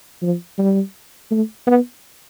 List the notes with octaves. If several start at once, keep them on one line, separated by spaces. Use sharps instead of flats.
F3
G3
A3
B3